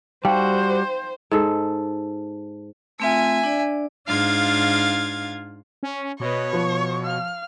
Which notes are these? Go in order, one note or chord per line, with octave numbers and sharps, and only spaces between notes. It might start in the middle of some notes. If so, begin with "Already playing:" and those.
G3 D#4 F#4 C5 F5 G5
G#2 A4
A3 C4 F4 E5 G#5
D4 D5
G#2 D4 F4 F5 G#6 A6
C#4
B2 B4 C#5 D#5
F3 C#6
F5 F6